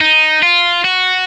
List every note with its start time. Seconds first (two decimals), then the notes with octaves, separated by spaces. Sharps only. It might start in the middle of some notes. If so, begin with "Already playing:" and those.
0.01 D#4
0.43 F4
0.84 F#4